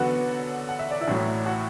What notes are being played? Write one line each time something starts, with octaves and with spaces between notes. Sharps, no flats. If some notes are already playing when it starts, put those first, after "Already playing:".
Already playing: E2 D3 F#3 B3 F#4 A4 B4 F#5
F#5
E5
D5
E4 E5
A1 A2 F#3
F#4 F#5